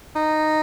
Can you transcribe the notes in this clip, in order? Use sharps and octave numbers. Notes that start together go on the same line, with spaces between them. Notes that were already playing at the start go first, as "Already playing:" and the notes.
D#4